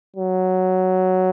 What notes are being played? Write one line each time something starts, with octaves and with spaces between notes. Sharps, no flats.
F#3